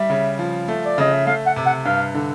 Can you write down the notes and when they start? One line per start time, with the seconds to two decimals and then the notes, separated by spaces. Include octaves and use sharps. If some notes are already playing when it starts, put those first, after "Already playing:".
Already playing: G3 E5
0.10 C#3
0.39 F3
0.68 A3
0.86 D5
0.98 C#3 D#5
1.13 E5
1.27 A3 F5
1.46 F#5
1.56 C3
1.66 F#5
1.85 G2 F5
2.14 D3